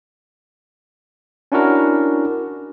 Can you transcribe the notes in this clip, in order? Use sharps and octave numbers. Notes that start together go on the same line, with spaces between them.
C#4 D4 E4 F#4 A#4